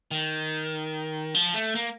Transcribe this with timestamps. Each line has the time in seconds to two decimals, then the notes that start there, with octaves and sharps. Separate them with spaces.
0.11 D#3
1.34 F3
1.54 A3
1.75 A#3